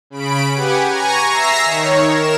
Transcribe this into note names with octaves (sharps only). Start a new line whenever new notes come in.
C#3 B5 D7
G4 B4 F#5 G#5
G#5 A#5 C#6 A#6
E5 A#5 E6 A#6 C7
D#3 C#5
A#4 E7